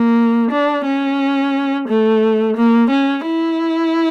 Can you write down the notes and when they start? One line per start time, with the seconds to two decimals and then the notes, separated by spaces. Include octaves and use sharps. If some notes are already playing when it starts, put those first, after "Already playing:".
Already playing: A#3
0.51 D4
0.85 C#4
1.88 A3
2.57 A#3
2.90 C#4
3.26 E4